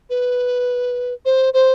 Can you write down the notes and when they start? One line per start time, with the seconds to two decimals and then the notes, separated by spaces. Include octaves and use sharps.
0.10 B4
1.25 C5
1.54 C5